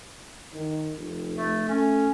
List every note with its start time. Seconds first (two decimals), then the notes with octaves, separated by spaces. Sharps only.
0.53 D#3
0.97 F1
1.36 A3
1.69 A3 C#4